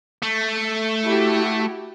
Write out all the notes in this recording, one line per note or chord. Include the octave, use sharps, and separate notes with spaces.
A3
E4 F#4 G4